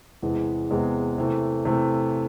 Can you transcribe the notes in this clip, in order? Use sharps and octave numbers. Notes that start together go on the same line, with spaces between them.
E2 C3 E3 G#3 B3
E2 C3 E3 G#3 B3
C3 E3 A3
C3 E3 A3